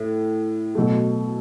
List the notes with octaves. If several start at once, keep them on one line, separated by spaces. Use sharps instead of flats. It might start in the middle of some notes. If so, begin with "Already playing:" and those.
Already playing: A2
B2 F#3 A3